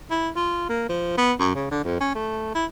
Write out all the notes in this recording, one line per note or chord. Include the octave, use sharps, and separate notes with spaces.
E4
F4
A#3
F3
B3
F#2
C#3
D3
F2
C#4
A3
E4